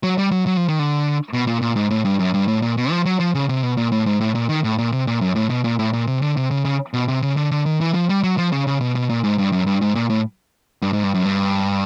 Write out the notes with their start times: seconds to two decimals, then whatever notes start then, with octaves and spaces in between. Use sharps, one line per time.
0.03 F#3
0.18 G3
0.32 F#3
0.47 F#3
0.57 F3
0.68 D#3
0.79 D3
1.33 B2
1.47 A#2
1.62 A#2
1.76 G#2
1.90 A2
2.05 G2
2.20 F#2
2.34 G2
2.48 A2
2.62 A#2
2.77 B2
2.91 F3
3.06 F#3
3.20 F3
3.35 C#3
3.49 C3
3.63 B2
3.77 A#2
3.92 A2
4.06 G#2
4.21 A2
4.35 A#2
4.49 D#3
4.64 A2
4.78 A#2
4.92 C3
5.07 A#2
5.21 F#2
5.36 A2
5.50 B2
5.64 A#2
5.79 A2
5.93 A#2
6.07 C3
6.22 D3
6.37 C3
6.51 C#3
6.65 C#3
6.94 B2
7.08 C3
7.22 C#3
7.37 D3
7.51 D3
7.66 D#3
7.81 E3
7.94 F3
8.09 G3
8.23 F#3
8.38 F3
8.52 C#3
8.67 C#3
8.81 B2
8.95 B2
9.10 A#2
9.24 G#2
9.38 G2
9.52 F#2
9.67 G2
9.82 G#2
9.95 A#2
10.10 A2
10.82 G2
10.93 G#2
11.04 G2
11.14 F#2
11.25 G2